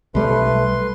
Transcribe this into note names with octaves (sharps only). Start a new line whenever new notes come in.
B1 G3 A3 B4 C6